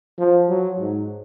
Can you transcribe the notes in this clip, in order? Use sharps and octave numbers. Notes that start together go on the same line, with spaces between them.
F3
F#3
G#2